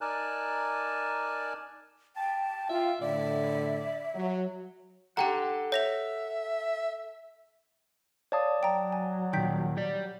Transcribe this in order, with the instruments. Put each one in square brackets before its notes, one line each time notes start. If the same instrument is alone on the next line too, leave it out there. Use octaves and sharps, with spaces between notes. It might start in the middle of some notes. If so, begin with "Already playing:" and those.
[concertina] D#4 A#4 D5 G#5 A5 F#6
[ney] G5 [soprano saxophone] A5
[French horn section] F4 [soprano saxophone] E5
[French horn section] A2 D3 [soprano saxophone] D5 [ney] E5
[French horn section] F#3
[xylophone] G4 G5 A#5 [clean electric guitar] A4 F#5
[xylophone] C#5 A#6 F7 [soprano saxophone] E5
[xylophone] C#5 F5 [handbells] D5 A5 D#6
[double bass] F#3 [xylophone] G5 A#5
[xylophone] G#5
[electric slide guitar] A#2 D#3 [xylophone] G5 G6 B6
[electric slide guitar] G4 D5